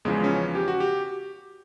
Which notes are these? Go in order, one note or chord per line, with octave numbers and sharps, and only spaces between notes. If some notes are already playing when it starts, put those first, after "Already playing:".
E2 C#3 F3 G#3
C#4
G4
F#4
G4